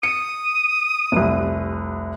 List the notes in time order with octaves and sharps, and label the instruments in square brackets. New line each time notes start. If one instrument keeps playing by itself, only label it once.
[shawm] D#6 [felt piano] C#7
[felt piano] F1 C2